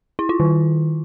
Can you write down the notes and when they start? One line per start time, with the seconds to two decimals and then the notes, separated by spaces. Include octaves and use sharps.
0.19 E4
0.29 F4
0.40 D#3